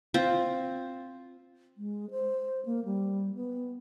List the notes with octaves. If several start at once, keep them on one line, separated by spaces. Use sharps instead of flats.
C4 F4
G#3
C5
A#3
G3
B3